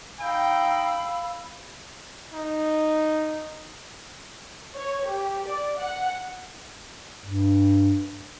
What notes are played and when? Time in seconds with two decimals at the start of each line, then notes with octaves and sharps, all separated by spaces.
0.20 D#4 F5 G5 B5 E6
2.33 D#4
4.77 C#5
5.08 G4
5.47 D5
5.78 F#5
7.24 G2